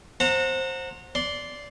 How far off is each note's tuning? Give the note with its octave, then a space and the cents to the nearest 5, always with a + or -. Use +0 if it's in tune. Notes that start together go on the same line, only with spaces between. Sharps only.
C5 +15 F#5 -25 A#5 -30
D5 -15 C6 +0